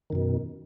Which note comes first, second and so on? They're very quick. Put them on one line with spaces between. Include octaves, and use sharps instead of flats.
D#3 F#2 B2